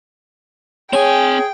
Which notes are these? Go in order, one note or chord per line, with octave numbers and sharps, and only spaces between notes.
C4 G#4 C#5 G5 G#5